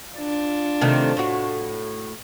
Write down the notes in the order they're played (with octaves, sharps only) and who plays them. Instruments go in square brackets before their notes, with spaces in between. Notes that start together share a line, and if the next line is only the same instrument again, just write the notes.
[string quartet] D4 F4
[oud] C3 D#3 A3
A2 F#4